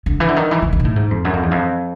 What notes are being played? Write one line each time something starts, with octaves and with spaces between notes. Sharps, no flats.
D3
E3
D3
D#3
E3
D#3
D#3
A#2
A2
G#2
F2
F#2
F2
E2
F2